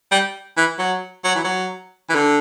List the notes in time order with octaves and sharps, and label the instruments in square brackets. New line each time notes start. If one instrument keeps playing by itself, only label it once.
[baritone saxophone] G3
E3
F#3
F#3
E3
F#3
E3
D3